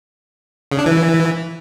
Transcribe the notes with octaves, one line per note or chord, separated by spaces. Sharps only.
C#3
D4
E3